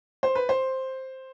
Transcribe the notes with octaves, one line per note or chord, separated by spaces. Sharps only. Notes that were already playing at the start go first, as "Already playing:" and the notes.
C5
B4
C5